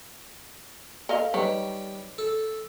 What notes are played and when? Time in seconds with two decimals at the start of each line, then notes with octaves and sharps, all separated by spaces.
1.09 A4 D#5 F5
1.34 D#3 G3 B4 C#5
2.18 A4